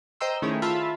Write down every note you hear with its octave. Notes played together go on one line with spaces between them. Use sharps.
C5 D#5 G5 A#5 C6 E6
D#3 A3 C#4 E4 G#4 C#5
F4 E5 A5 B5